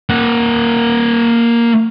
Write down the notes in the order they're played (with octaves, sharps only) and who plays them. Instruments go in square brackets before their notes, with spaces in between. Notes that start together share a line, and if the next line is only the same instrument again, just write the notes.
[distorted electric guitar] A#3 F#5